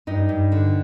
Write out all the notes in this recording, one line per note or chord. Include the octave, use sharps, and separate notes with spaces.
G2 D#4
G2
D3